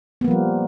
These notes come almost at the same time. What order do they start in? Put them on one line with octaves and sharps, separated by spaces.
B3 A#3 F3 G3